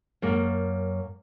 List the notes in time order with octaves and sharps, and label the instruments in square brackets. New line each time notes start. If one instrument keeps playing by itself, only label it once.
[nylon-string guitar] F#2 A#3